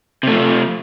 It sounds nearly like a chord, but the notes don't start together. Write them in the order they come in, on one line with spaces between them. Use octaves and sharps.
C3 A3 F3